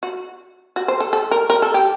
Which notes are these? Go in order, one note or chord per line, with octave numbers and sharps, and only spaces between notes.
F#4
F#4
C5
A4
A4
A#4
A#4
A4
G4